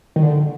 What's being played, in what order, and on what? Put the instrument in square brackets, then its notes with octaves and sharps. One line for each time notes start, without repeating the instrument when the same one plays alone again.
[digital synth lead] D#3
D3